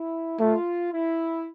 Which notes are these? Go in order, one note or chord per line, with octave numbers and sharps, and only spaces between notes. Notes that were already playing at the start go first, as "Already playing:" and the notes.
Already playing: E4
A3 F4
E4